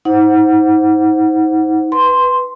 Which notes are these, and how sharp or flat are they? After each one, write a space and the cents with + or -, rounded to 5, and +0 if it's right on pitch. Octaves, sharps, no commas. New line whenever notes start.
D#4 +35 C5 +0 F#5 -5
B4 +0 C6 +0